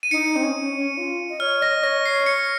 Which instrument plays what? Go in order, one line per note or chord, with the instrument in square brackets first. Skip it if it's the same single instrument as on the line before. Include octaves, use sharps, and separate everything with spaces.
[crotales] D#7
[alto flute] D#4 [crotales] C#7
[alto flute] C4
C#4
C#4
F4
D#5
[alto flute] C#5 [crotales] F6
[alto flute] D#5 [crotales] A#6
[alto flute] C#5 [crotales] A#6
[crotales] C7
C#7